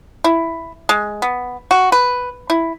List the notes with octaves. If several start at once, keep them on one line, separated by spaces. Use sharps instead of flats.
E4
G#3
B3
F#4
B4
E4